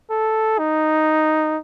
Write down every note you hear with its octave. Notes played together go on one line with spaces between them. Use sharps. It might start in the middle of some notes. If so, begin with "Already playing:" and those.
A4
D#4